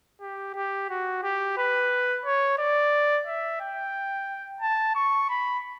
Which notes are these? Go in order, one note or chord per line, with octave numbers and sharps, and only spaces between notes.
G4
G4
F#4
G4
B4
C#5
D5
E5
G5
A5
C#6
B5